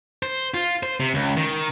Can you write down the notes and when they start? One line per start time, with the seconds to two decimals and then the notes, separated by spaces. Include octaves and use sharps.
0.23 C5
0.54 F4
0.83 C5
1.00 C3
1.14 C#2
1.37 D#3